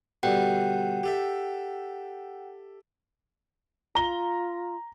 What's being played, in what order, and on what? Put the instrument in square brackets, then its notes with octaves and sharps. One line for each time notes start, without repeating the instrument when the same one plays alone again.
[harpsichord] B2 D3 G3 [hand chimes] F#5 G5
[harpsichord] G4 A4 E5
[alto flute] F4 [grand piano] A#5 G7